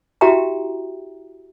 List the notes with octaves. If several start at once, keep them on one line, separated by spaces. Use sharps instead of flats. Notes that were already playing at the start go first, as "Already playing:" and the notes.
E4 F#4 G4 E5 G5 A#5